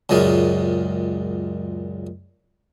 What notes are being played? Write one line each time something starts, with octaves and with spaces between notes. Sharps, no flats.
C#2 F#2 A#2 G#3